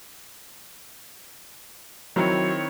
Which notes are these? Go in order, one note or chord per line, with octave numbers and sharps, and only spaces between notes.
D#3 F#3 C4 E4 C#5